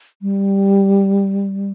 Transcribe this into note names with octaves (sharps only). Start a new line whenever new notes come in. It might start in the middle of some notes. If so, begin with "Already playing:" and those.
G3